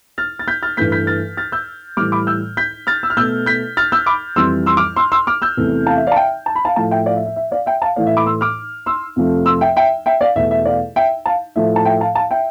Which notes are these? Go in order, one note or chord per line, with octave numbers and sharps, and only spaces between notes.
F6 A6
A6
G6 B6
F6 A6
G2 E3 A3 G6 B6
G6 B6
F6 A6
F6 A6
E6 G6
A2 E3 G3 D6 F6
B5 D6
E6 G6
G6 B6
F6 A6
E6
F6
B2 A3 E6 G6
G6 B6
F6 A6
E6 G6
B5 D6
F2 E3 G3 C6 E6
C6 E6
D6 F6
C6 E6
C6 E6
D6 F6
E6 G6
E2 C3 E3 A3
F5 A5
E5
D5 F5
A5
E5 G5
A5
B5
F5 A5
A2 F3 A3 F5 A5
E5 G5
D5 F5
E5
E5
E5
D5 F5
E5 G5
F5 A5
A2 E3 A3 D5 F5
E5
B5 D6
C6 E6
D6 F6
C6 E6
F2 C3 F3 A3
C6 E6
E5 G5
E5 G5
E5 G5
D5 F5
E2 B2 A3 E5
E5
D5 F5
E5 G5
F5 A5
A2 F3 A3 E5
A5
E5 G5
F5 A5
F5 A5
E5 G5